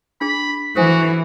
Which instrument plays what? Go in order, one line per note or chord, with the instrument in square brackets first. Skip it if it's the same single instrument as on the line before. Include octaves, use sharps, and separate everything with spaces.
[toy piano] D4 G#4 [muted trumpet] B5
[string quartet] E3 [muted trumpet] F#4 [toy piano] A4 C5 G#5